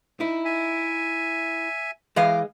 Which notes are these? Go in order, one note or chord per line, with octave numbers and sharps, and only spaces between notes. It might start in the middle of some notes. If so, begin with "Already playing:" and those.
D#4 E4
E5 G#5
E3 G#3 D#5 F5 D6